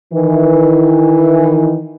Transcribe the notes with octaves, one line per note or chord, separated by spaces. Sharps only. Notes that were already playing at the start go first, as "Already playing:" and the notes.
D#3 E3